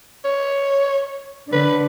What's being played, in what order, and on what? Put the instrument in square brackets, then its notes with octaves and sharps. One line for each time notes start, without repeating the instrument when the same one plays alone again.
[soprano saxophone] C#5
[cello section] D3 [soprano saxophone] B4